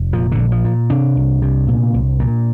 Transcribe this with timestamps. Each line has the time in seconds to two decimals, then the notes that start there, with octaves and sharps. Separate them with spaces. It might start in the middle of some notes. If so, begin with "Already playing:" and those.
Already playing: F1
0.13 A#2 F3
0.32 D3
0.39 A#1
0.52 F3
0.64 A#2
0.90 C3 D4
1.16 C2
1.42 C3
1.67 A#2
1.94 C2
2.20 A#2